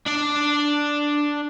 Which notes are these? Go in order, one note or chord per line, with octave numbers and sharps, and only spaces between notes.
D4 D5